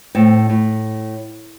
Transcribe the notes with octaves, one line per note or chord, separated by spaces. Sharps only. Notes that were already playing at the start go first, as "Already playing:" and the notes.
A2 C4
A2